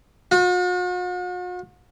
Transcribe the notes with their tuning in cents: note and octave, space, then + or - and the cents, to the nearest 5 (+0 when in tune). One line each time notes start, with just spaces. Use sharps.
F#4 -45